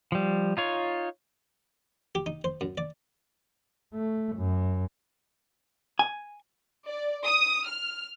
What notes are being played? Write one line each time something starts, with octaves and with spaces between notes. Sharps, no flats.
F3 G3
D#4 F4 C#5
G4
D#4
C5
F#2
D5
A3
F#2
G#5
D5
D#6
F6